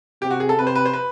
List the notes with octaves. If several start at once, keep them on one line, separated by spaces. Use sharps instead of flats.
C3 G4
F#4
G#4
A4
C3 B4
C5
B4
C5
B4